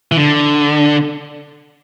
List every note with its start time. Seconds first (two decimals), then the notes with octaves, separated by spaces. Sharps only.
0.12 E3
0.17 D3